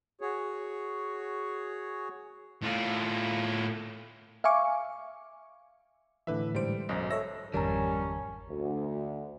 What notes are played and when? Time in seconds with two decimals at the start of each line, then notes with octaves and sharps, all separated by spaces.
0.21 F#4 G#4 C#5
2.62 A2 F4
4.44 E5 F5 G#5 C#6 D6
6.27 A2 D3 E3 B4 E5
6.55 G#2 G3 C5 D7
6.89 B1 F#2 D#5
7.10 A4 C#5 E5 E6 A#6
7.54 G#1 F2 D#3 G3 C#4 A#4 A5 A#5
8.50 D2